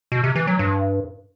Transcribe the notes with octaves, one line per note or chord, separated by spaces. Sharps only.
B2
C3
E3
F#3
G2